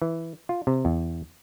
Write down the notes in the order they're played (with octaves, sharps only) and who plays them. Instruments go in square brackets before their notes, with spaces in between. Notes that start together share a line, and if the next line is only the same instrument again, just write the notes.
[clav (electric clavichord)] E3
F4
C3
E2